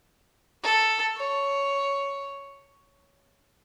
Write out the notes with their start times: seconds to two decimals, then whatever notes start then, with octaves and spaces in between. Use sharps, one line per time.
0.63 A4
1.17 C#5